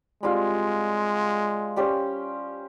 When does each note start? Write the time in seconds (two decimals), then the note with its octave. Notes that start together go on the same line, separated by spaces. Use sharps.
0.23 G3 G#3 C4 F4
1.76 G3 C#4 G4 C5